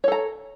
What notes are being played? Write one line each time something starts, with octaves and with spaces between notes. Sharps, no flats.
A4 C#5 A#5